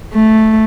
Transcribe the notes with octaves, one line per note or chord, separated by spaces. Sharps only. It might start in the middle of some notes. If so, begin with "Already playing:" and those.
A3